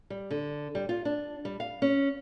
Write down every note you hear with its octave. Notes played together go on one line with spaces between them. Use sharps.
G3
D3
G3
F4
D4
G3
F5
C#4